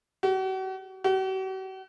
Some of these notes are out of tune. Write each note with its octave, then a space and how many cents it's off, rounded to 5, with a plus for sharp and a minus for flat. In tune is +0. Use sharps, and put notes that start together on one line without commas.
F#4 +40
F#4 +45